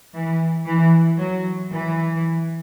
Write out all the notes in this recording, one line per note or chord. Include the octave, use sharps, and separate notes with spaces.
E3
E3
F#3
E3